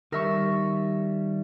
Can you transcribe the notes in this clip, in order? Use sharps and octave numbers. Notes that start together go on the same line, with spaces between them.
D#3 G3 A#4 E5 C#6